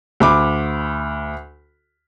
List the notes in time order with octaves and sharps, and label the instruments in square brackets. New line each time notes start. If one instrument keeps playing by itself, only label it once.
[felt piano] D2 B5 D6